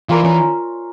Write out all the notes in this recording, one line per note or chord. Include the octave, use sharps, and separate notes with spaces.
E3 F4 A#4 D5
E3 C#4